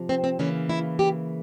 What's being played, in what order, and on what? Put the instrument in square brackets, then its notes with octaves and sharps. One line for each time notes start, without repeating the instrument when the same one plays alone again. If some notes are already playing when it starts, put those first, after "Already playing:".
Already playing: [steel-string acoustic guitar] C3 F3
C4
C4
C#3 E3 A#3 C#4
E4
G4